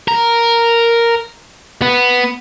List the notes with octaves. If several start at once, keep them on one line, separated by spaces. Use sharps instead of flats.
A#4
B3